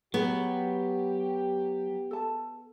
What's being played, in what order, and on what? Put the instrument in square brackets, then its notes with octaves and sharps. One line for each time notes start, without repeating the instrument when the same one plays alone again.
[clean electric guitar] F#3 [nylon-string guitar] B3 [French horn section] G4 [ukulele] G#4
[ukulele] A4 A5